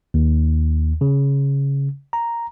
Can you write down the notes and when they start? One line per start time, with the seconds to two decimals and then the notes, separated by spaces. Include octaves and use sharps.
0.14 D#2
1.01 C#3
2.13 A#5